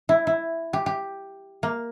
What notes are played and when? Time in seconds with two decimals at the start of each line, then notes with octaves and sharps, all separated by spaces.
0.09 E4
0.27 E4
0.73 G4
0.86 G4
1.63 A#3